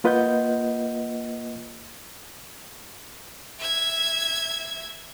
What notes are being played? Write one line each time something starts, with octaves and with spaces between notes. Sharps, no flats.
A#3 F4 B4 D#5 F#5 G6
E5 G#6